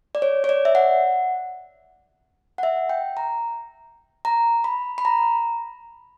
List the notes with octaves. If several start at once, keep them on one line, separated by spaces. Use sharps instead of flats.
D5
C#5
C#5
D5
E5
F#5
F#5
E5
G5
A#5
A#5
B5
B5
A#5